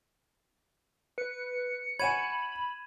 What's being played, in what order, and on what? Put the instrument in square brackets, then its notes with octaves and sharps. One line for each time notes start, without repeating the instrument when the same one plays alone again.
[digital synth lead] B4 [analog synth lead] C#7
[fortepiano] C#5 F#5 G#5 [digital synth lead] B5 [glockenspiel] G#6 D#7 E7